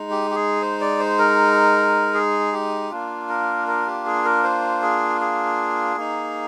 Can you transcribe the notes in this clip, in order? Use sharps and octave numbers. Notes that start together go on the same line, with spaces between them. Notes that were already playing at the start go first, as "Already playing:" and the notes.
Already playing: G#3 D#4
G4
G4
G#4
C5
D5
C5
A#4
G#4
G4
A#3 D4 F4
A#4
A#4
G4
G#4
A#4
C5
G#4
G#4
A#3 D#4